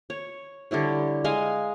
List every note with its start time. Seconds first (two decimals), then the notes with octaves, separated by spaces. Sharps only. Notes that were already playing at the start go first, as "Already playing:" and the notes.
0.10 C#5
0.71 D3 G3 E4 C#5
1.24 G#3 D#5 F5 G#5